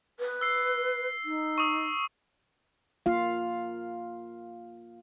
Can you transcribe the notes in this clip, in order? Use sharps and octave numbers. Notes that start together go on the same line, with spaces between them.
B4
E6 C7
D#4
C#6 D#6
A#3 F4 F5